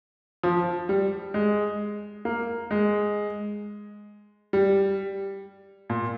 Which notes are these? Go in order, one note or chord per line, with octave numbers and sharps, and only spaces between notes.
F3
G3
G#3
A#3
G#3
G3
A#2